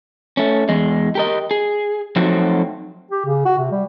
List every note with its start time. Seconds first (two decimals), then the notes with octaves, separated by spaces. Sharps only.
0.37 A3 C#4
0.69 E2 G#3
1.15 G4 A#4 D#5
1.51 G#4
2.16 F3 F#3 A3 C4 D#4 F#4
3.11 G4
3.26 C#3
3.46 F#4
3.58 C3
3.72 G3